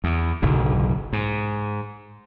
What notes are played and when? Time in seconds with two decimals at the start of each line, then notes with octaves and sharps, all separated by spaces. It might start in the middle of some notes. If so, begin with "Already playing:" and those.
0.04 E2
0.42 F#1 B1 G#2 D3
1.13 G#2